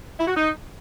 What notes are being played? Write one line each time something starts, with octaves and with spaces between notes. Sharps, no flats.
E4
F#4
D#4